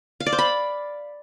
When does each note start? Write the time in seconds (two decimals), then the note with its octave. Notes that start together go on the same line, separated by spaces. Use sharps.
0.20 F5
0.26 D5
0.32 C5
0.38 B5